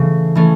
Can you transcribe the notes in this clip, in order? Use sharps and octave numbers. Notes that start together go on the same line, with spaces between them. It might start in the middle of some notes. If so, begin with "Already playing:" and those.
Already playing: C#3 E3 A3 C#4
E3 A3 C#4